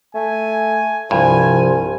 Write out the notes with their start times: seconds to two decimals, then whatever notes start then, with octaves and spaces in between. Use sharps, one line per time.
0.15 A3 G#5
1.11 C2 G2 C3 F3 F4 G#5